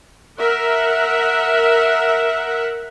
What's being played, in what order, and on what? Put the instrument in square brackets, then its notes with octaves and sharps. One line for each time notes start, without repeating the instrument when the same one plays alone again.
[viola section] A#4 E5 F#5